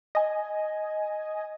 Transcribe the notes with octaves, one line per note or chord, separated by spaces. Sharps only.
D#5 G#5